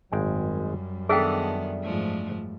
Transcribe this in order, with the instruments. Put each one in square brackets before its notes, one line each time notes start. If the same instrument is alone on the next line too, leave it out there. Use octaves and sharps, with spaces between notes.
[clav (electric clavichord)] G#1 G#3 G5 [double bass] F#2 G3
[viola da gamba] D#3 B3 [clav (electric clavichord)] D4 E5 [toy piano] G#4 A4 G5
[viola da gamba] G#2 F3 A3